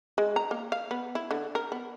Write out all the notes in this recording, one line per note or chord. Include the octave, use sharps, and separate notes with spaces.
G#3
A#5
A#3
F5
B3
E4
D3
A#4
B3